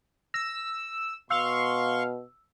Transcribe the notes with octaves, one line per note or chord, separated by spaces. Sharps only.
E6 A#6
B2 F5 C6 C#6 E6